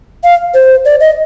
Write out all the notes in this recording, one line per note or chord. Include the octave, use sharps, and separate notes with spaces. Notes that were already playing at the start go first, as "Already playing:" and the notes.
F5
C5
D5
D#5